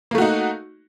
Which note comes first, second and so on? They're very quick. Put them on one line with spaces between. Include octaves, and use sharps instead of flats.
A#3 A3 F#4 D#4